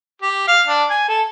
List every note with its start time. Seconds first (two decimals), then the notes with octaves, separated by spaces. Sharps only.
0.22 G4
0.48 F5
0.67 D4
0.90 G#5
1.08 A4